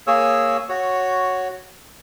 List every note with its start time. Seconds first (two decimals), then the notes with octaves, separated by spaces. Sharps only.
0.07 A#3 G#4 C#5 E6
0.69 F#4 C#5